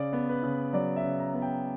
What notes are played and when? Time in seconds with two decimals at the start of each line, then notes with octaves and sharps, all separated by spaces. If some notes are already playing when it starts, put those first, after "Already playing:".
Already playing: C#3 D5
0.13 B3
0.29 B4
0.43 C#3
0.73 F#3 D5
0.96 E5
1.04 C#3
1.19 A#5
1.34 B3
1.42 G5